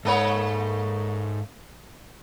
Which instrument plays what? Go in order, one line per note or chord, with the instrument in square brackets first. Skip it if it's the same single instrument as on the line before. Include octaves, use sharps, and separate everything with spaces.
[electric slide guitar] G#2 [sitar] A3 A#3 C#5